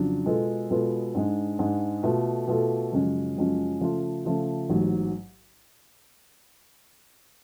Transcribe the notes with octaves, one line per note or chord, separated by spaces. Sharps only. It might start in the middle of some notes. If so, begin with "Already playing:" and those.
Already playing: F2 C#3 F#3 D4
B2 G#3 B3 F4 A4
B2 G#3 B3 F4 A4
G#2 G#3 D4
G#2 G#3 D4
B2 A3 F4 A4
B2 A3 F4 A4
F#2 C#3 F3 G#3 C#4
F#2 C#3 F3 G#3 C#4
C#3 F3 A3 F4
C#3 F3 A3 F4
A1 G#2 F#3